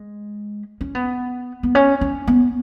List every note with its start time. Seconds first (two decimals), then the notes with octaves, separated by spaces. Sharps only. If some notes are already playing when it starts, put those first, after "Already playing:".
Already playing: G#3
0.81 C#4
0.95 B3
1.63 B3
1.75 C#4
2.01 C#4
2.27 B3